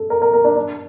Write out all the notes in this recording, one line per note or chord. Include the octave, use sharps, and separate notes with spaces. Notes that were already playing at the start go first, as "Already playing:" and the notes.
Already playing: A4
A#4
A#4
A#4
D4
D4